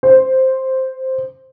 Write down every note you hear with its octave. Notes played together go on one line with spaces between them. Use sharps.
C5